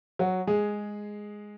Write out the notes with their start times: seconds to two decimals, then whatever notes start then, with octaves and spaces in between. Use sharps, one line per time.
0.19 F#3 F#4
0.47 G#3 G#4